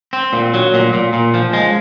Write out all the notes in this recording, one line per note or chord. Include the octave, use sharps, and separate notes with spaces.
C4
A#2
F#3
A#2
A#2
A#2
F3
G#3